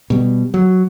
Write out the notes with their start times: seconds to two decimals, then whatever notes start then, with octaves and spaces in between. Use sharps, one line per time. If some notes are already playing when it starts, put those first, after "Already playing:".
0.10 B2 G3
0.54 F#3